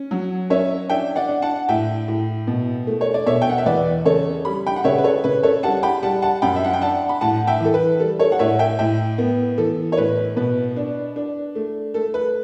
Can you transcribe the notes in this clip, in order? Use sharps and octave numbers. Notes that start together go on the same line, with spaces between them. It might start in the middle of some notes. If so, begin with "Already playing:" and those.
Already playing: C#4
F#3
C#4 C#5 E5
D4 E5 G5
D5 F#5
D4
F#5 A5
A2 E5 G5
A2
B2
A3
C#5
D5
B2 C#5 E5
G5
F#5
E5
E2 B4 D5
C#3 A4 C#5
G3 B5
G5 B5
F#5
C#3 C#5 E5
B4
A4 C#5
C#3 B4
A4 C#5
G3 F#5 A5
G5 B5
G3 F#5 A5
F#5 A5
F#2 G5 B5
E5
F#5
G5
D4 F#5 A5
B5
A2 F#5 A5
E5 G5
E3 A4
B4
G3 A4
A4 C#5
F#5
A2 C#5 E5
E5 G5
A2 E5 G5
B3
E3 A4
C#5
A2 B4
B2 B4
D4
D4
A3
A3 A4
B4